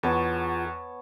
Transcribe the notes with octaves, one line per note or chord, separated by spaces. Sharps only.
E2 B3 F4 G#4 C#5 A5